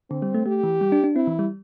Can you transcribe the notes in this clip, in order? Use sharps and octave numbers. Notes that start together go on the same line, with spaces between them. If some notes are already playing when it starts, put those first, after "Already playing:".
D3 C4
G3
A3
A3 G4
E3
G3
D4
D4
C4 E4
E3
G3